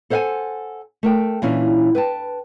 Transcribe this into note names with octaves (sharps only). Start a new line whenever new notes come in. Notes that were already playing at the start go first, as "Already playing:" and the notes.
A4 C5 C#5 F5 F#5 G#5
A3 A#4 G5
A#2 E3 C#4 D4
B4 G5 A5